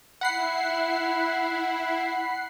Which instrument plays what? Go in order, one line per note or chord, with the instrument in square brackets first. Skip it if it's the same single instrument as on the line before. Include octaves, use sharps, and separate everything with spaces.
[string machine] E4 [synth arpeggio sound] F#5 B5 C7